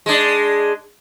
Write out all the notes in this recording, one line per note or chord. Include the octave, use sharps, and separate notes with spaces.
G#3 D4